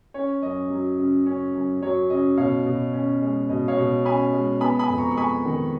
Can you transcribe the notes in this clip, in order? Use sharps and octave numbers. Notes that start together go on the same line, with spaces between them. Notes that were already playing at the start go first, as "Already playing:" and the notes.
C#4 C#5
F#2 D#5
F#3
C#3
C#4
F#2
F#3 C#5
C#3 D#5
B2 C#5 F5
B2
C#4
G#3
B2 D#5
C#5 F5
B2
C#4 G#5 B5
G#3
B3 G#5 B5
G#5 B5
F2
A#5 C#6
C#6
G#3 G#5 B5
D#3